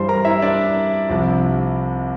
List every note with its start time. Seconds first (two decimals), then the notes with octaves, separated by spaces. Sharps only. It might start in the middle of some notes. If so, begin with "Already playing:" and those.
Already playing: G2 E3 G3 C5 C6
0.08 A#4 A#5
0.25 E4 E5
0.42 D4 D5
1.09 C2 C3 F3